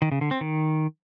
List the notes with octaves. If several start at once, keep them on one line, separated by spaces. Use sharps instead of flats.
D#3
C#3
D3
C4
D#3